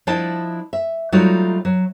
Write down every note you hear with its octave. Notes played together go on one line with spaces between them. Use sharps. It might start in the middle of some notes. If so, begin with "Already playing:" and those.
F3 D4 E4 D#5 A5
E5
F#3 G3 A3 D#4 F4 F#4
F#3